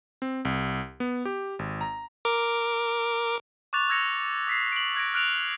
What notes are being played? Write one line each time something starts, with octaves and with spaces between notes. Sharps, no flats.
C4
C2
B3
G4
G#1
A#5
A#4 D6
C#6 D6 F#6 A6 F7
E6 G#6 A#6 C#7 F7
D#6 B6 C7
D7 F#7
F#6 G#6 A#6 D7
F6 F#6 D7 F7